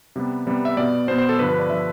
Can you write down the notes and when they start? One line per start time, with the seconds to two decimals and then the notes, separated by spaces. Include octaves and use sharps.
0.16 C3 G3 B3
0.47 C3 G3 B3
0.65 E5
0.77 B2 B3 D5
1.08 B2 C5
1.11 B3
1.18 C5
1.29 A4
1.39 G2 D3 F3 B4
1.49 B4
1.59 D5
1.69 D3 F3 E5